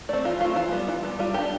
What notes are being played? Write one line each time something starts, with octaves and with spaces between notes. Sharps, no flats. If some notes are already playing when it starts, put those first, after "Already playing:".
A3 C4 D5
E3 F4
A3 C4 F4
E3 F4
G3 B3
E3 F4
G3 B3
G3 F4
B3 D4 G4